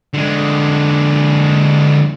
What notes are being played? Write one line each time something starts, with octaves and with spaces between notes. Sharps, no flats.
D3 G#3